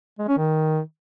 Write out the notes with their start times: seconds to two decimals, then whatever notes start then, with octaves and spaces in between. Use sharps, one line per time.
0.19 G#3
0.28 C#4
0.38 D#3